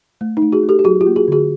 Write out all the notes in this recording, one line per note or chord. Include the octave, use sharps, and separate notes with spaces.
A3
D#4
A3
F#4 G#4
A3
G4 A4
G4
F#3 F#4 G#4
F4 G4
A#3
F#4 G#4
D3 F#4 G#4